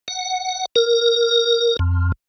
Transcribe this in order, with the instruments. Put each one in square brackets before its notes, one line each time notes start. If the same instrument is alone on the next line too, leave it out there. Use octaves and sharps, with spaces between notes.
[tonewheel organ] F#5
A#4
F2